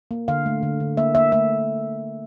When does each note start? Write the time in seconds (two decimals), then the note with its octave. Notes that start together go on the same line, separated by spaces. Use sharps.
0.11 A#3
0.28 D3 F5
0.46 A3
0.63 D3
0.80 D3
0.97 A#3 E5
1.15 A#3 E5
1.32 A3 E5